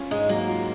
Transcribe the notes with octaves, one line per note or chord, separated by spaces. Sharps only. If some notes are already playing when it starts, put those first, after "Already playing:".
Already playing: C#4 F4
G#2 G#3
F#3 A#3
F4